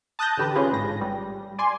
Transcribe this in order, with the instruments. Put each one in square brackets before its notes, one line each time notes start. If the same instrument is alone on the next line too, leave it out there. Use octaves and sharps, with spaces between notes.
[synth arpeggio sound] A5 D#6 F#6 G6 A6 A#6
A1 D3 G4 B4
C3 C#4 F4 G#4 B4
A1 G#2 A#6
G3
D5 G#5 C6